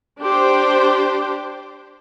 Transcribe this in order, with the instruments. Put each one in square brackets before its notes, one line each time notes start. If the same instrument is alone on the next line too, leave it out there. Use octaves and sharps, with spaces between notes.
[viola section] D4 G4 C5